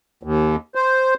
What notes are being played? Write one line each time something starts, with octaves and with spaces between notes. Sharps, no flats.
D#2
C5